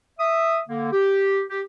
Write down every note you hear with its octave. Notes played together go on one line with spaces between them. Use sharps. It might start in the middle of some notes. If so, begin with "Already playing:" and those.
E5 D#6
D3 A#3
G4
G4